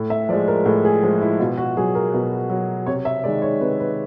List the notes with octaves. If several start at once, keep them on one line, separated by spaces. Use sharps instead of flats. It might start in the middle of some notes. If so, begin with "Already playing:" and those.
Already playing: A2
E5
F3 G#3 D5
A#4
A2 G#4
G#4
F3 G#3
E4
B2 F4
F#4
F#3 G#4
A#4
B2 B4
F#3
C3 C#5
E5
D#3 G#3 D5
C#5
C3 B4
B4